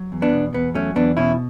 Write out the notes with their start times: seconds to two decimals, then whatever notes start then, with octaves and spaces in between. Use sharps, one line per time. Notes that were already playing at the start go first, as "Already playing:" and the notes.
Already playing: F#3
0.12 E2
0.22 B3 D4
0.32 B2
0.53 E2 B3
0.75 F#3 A3 C#4
0.96 E2 B3 D4
1.17 B2 C#4 E4